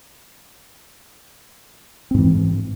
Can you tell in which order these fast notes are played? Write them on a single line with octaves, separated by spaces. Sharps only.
C4 G#2 E3